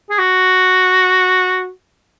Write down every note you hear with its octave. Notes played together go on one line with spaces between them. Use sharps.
G#4
F#4